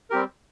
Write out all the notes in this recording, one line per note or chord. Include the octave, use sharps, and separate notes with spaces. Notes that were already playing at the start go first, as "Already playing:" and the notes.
G3 C4 G4 A#4